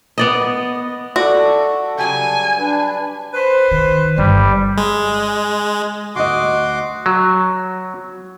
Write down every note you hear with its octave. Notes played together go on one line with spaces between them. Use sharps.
B3 D5 D#5
F#4 A4 D5 E5
C#3 F#3 G3 G#5 A5
D4 B4
B4 C5
D#3
G1 D3 G3
G#3
D2 F#4 D#5 C6 D6
F#3